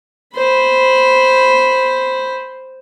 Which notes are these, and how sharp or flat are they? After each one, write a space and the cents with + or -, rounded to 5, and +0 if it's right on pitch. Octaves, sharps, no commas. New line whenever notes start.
C5 +0 B5 +0